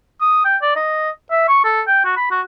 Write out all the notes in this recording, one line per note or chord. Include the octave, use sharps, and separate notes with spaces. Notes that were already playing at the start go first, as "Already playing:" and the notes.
D#6
G5
D5
D#5
E5
C#6
A4
G5
F#4
B5
F#4